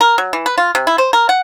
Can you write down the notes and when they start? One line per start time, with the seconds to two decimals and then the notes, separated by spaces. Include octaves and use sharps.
0.01 A#4
0.18 F#3
0.33 E3
0.46 B4
0.58 F4
0.75 C3
0.87 E4
0.98 C5
1.13 A#4
1.29 F#5